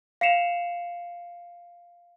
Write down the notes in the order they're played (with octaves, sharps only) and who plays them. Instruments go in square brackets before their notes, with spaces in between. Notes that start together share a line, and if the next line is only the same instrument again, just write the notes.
[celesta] F5 C7 C#7 E7 F7